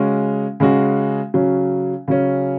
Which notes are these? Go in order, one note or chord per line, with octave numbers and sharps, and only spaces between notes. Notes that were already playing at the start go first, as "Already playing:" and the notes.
Already playing: C#3 G#3 C#4 F#4
C#3 G#3 C#4 F#4
C#3 F#3 C#4
C#3 F#3 C#4